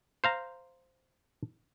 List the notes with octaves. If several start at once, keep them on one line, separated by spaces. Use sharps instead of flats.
C5 F5 A#5